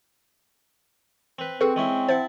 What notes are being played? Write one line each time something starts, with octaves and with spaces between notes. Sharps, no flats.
C4 B4
C4 F#4 G#4 A4 B4
G#3 C#4 E4
E4 C5 F#5 A5